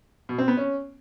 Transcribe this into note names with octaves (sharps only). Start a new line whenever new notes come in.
B2
C4
B3
C#4